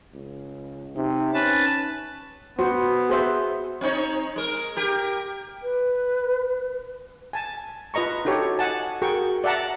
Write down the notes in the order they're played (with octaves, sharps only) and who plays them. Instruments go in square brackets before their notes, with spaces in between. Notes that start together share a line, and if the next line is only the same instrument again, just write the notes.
[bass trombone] C#2
[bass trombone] C3 [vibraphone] D#4
[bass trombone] C#4 [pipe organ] B4 A5
[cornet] B3 [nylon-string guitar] F#4 [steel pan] C5
[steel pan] G#4 C5 E5
[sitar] C4 D#4 C#5
G#3 A#4
G4 A#4
[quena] B4
[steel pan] G#5 A5
F4 B4 D#5 A#5 C#6
D#4 F#4 G4 A4 C#5
D#5 F#5 G#5 A5
F#4 G#4 A#4 G5 C#6
D5 E5 F#5 A5 A#5